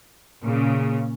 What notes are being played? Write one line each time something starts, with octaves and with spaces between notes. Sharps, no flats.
A#2 C#3